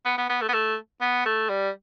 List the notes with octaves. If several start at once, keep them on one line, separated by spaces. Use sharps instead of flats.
B3
B3
B3
A3
B3
A3
B3
A3
G3